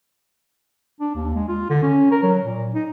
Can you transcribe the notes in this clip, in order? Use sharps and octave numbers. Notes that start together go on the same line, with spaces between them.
D4
D#2
G#3
F4
D3
C#4
A#4
F#3
A#2
D#4